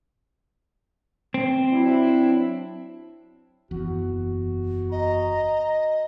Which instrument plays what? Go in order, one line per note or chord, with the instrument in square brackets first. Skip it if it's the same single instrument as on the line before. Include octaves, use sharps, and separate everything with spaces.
[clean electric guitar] C4
[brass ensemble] F#3 D4 E4
[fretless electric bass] F#1 E2 [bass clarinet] F#4
[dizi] D#5 [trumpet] A#5